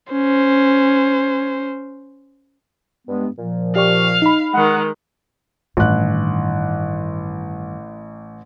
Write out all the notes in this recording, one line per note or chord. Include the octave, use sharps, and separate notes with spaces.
C#4 C5
G2 G#3 B3
A#2 F3
G4 D5 F5 C#6
D#4 B5
D#3 G#3 F#5
A1 G2 D#3 F#6